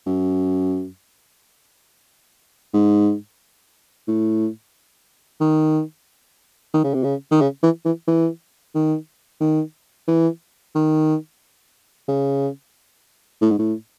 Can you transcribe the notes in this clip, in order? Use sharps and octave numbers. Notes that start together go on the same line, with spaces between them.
F#2
G#2
A2
D#3
D#3
C#3
C3
C#3
D#3
C#3
E3
E3
E3
D#3
D#3
E3
D#3
C#3
A2
G#2
A2